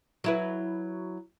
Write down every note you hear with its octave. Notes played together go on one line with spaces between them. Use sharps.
F#3 E4 B4